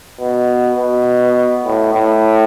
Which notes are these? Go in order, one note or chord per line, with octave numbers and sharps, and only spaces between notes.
B2
B2
A2
A2